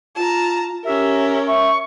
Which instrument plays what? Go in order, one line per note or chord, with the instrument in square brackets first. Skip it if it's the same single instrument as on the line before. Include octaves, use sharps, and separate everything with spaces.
[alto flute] F4 [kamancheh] A5 A#5
[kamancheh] C#4 A#4 [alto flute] G4 [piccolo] E5
[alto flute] E5 [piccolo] C#6